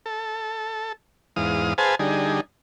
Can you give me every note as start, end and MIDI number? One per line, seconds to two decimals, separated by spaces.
0.06 0.92 69
1.36 1.74 40
1.36 1.74 44
1.36 1.74 77
1.36 1.74 87
1.78 1.95 68
1.78 1.95 71
1.78 1.95 72
1.78 1.95 77
1.78 1.95 80
1.78 1.95 81
1.99 2.40 50
1.99 2.40 55
1.99 2.40 63
1.99 2.40 68